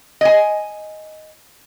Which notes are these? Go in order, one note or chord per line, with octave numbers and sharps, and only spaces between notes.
D#5 G#5